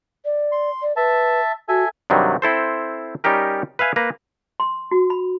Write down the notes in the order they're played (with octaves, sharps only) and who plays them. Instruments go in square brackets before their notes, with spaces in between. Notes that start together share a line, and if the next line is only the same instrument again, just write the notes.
[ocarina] D5
[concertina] C6
[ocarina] D5
[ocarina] B4 [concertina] E5 A5
[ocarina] F#4 [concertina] A4 E5 G#5
[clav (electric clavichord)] G2 C3 D#3 F#3 G3
C4 E4 A4 C5
G3 C#4 D#4 G4 A#4
B4 E5 F5 G#5
A#3 B4 A#5
[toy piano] C6
F#4
B5